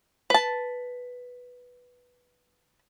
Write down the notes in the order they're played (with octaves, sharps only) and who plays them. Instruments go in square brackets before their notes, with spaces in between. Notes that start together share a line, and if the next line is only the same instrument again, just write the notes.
[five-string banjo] B4 A5